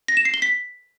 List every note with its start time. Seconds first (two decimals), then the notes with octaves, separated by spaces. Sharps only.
0.08 A#6
0.17 E7
0.25 C7
0.34 G7
0.42 B6